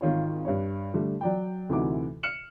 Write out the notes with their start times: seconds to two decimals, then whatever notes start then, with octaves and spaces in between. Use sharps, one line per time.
0.01 G#1 D#3 F4 C#5
0.45 G2 C#5
0.94 D3 G3 A3
1.21 F#3 D5 G5
1.69 D2 C3 E3 D#4 F#4 D6
2.23 F6 C#7 E7 F#7